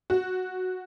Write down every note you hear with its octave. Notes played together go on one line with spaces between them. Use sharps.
F#4